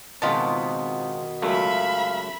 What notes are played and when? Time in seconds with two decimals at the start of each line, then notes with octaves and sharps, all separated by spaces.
0.22 C#2 B2 D#3 B3 C4 F4 A5
1.42 C#2 F#2 A3 E5 F5 B5